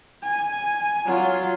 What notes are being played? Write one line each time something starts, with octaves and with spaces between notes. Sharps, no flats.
G#5
F#3 F4